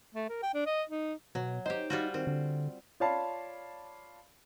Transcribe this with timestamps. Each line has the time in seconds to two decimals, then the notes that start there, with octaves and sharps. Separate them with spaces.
0.15 A3
0.29 A#4
0.42 G5
0.54 D4
0.66 D#5
0.90 D#4
1.35 B2 F#3
1.66 D#4 G4 C5
1.90 G3 F4 F#4
2.14 D#3 C4
2.27 D3
3.00 F4 C#5 D5 F5 A5 B5